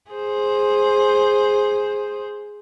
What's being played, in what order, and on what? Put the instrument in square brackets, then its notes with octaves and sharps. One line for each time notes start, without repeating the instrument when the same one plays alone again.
[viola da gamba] G#4 C5